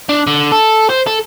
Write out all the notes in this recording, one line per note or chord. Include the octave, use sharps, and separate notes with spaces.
D4
D3
A4
C5
A4